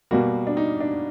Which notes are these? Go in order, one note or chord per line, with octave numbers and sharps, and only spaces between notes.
B2 G3 A#3 F#4
D4
D#4
D4